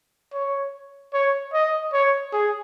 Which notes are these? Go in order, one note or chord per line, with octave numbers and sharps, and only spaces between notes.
C#5
C#5
D#5
C#5
G#4